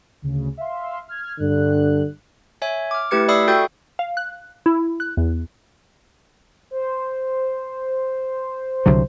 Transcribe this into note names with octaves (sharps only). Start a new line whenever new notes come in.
D2 C#3
E5 F5 C6
F6 G#6
G2 D3 F#6
C#5 E5 G#5
D6 F6
A3 E4 G4 B4 G#6 C#7
D5 E5 B5 D#6 E6 C7
F#4 A4 G5 C#6 G6 A6
F5
F#6
E4
F#6
E2
C5
C2 D3 F#3